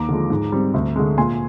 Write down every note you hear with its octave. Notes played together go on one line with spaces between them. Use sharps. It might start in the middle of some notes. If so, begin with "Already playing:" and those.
Already playing: D#2 A#5 D6
D3 F3 G#3
G#2
G3 C4
D2
D3 G#3
A#2 G#5 C6